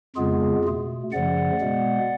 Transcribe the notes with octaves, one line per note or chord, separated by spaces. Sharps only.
F2 C#3 G#3 B3 F4 G#4
B2 A3
F#2 C#3 F3 A3 D5 F#5
B2 G#3 B3